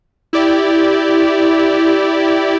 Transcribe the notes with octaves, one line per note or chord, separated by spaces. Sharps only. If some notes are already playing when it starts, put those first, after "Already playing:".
E4 G4 D5